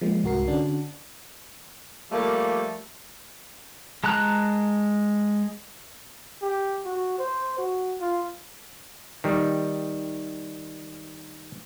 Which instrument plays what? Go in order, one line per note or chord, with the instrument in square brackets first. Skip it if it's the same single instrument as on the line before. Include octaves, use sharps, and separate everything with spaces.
[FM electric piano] F3 G#3 A#3
C2 G#2 F#4 A#4 C7
D3 C#4 D4 F#4
[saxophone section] F3 G3 A3 A#3
[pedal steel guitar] G#3 A5 A#5 F#6
[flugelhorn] G4
F#4
C5
F#4
F4
[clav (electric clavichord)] D#3 G3